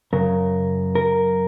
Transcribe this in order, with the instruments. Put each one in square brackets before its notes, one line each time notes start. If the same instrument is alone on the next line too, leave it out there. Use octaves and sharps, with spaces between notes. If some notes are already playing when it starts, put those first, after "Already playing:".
[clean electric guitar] F#2 C#3 F#3 A#4
A#4